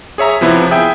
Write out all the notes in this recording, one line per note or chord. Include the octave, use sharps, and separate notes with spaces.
G#4 C#5 E5 A#5
C3 F3 B3 E4
G#4 E5 G5